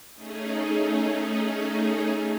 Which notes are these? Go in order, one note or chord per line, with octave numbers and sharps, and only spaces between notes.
A3 C#4 D#4 G#4